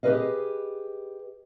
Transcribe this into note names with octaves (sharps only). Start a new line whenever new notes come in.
G4 G#4 A#4 B4 D#5 F5